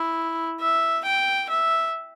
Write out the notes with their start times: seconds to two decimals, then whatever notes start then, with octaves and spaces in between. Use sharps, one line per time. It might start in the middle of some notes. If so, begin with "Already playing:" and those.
Already playing: E4
0.60 E5
1.04 G5
1.49 E5